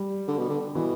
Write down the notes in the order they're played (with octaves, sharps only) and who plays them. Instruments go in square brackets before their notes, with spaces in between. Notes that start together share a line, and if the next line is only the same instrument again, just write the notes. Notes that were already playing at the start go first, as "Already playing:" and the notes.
Already playing: [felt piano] G3
[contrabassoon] D3
B2
D3
[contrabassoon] B2 [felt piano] E3